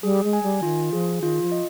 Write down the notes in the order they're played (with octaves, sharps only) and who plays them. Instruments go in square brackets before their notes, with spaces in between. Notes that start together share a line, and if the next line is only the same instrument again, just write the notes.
[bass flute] G3 [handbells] G#4
[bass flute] G#3
[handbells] G#5
[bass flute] G3
[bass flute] D#3 [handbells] F4
[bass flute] F3 [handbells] G#4
[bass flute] D#3 [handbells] F4
[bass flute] F3
[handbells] D#5